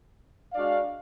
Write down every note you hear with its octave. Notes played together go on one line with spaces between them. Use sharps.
G#3 D4 F#4 D5 F5